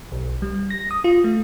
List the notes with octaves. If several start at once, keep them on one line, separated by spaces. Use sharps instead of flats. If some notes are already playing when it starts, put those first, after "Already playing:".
B1
G3
A#6
D#6
F4
A3